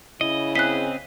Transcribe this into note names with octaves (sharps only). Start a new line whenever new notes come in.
C#3 E4 D#5
C4 G#4 D#5 F#6 B6